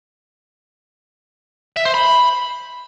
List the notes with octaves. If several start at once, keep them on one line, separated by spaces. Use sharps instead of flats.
E5
C5
B5